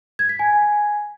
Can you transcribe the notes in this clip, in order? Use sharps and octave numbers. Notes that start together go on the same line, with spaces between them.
G#6
B6
G#5